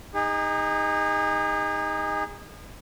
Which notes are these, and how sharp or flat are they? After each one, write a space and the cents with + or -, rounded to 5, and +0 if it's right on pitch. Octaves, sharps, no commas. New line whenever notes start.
D#4 +0 G#4 -35